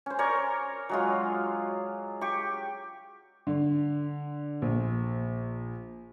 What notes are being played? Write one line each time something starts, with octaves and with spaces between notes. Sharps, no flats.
C#4 C5
A#4 C#5 D5 C#6
F#3 G#3 F4
G4 C#6
D3
A#1